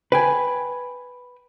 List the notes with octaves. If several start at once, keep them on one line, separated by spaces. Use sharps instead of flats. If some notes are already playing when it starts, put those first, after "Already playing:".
B4 G5 G#5